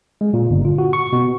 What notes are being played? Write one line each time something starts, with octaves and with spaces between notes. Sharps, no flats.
G#3
A#2
G1
F4
F#4
C#6
B2